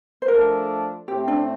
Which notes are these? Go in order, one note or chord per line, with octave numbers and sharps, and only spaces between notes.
C5
F3 A3 D4 A4 A#4
A2 A3 C4 G4
D4